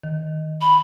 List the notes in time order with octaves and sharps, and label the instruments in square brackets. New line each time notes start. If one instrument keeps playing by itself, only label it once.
[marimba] D#3
[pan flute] B5